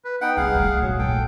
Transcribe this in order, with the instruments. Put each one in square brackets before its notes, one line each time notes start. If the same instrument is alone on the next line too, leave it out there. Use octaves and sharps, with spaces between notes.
[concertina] B4
[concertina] B3 D#4 G5 [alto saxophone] F#5
[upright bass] C2 [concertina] G#4 F5 [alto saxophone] F#5
[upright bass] A3
[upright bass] A#2 [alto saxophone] F#3
[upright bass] A#1 [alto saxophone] A4 [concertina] G5